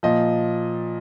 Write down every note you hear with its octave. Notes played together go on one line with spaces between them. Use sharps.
A#2 F3 D#5